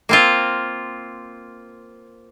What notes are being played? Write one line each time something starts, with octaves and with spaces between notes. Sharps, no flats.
A#3 C4 F4